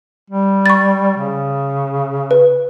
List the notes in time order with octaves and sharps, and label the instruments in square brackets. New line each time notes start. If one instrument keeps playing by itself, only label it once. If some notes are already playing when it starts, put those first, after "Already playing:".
[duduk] G3
[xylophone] C#6 A6
[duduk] C#3
[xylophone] B4